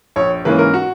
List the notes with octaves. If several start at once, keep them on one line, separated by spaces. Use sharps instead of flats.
A#1 C#5
G#2 E3 A#3 C#4 B4
A#4
F#4